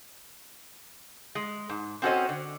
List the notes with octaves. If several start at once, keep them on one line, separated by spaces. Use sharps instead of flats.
G#3
G#2
C4 C#4 F#4 A4 C5 D#5
D3